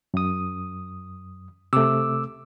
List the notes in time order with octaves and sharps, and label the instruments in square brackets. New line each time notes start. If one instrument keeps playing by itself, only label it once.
[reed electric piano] F#2 D#6
[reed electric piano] C3 A3 [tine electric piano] D6 E6